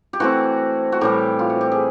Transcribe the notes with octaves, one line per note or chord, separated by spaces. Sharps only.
G4
E3 A3 C4 F#4
F#4
A2 E3 G3 G4
F4
F#4
G4
G#4